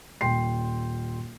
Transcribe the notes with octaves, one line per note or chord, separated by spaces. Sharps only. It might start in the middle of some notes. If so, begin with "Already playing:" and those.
D#1 G5 C6 C7